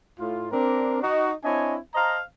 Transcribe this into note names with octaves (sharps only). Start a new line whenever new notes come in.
A2 F4
C4 D4 A#4
D#4 F#4
C4 D4 E4 C#5 D#5 G#5
C5 D#5 F5 A5 A#5